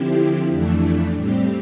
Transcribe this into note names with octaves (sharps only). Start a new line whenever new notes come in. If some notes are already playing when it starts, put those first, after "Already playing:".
Already playing: D3 F3 C4 E4 G4
F2 E3 A3 D4
A2 G3 C4 G4